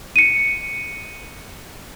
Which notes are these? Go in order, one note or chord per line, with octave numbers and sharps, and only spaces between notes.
C#7 D#7